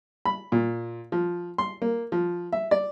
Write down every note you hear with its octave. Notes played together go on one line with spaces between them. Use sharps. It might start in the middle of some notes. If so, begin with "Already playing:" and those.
B5
A#2
F3
C6
A#3
F3
E5
D5